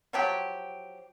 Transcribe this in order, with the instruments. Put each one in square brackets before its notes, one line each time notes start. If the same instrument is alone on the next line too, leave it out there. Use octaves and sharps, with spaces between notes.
[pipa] F3 F#3 G4